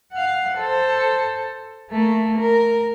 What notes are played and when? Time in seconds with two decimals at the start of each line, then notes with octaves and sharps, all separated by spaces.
0.13 F5 F#5
0.57 A4 C5
1.91 A3 A#3
2.38 A#4